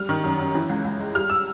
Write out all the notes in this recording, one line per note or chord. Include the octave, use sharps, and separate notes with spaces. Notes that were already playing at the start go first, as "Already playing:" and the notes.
Already playing: G3 F6
D#3
F#2
F#2
E3
C#2
C#2
G#3
G3 F6
E6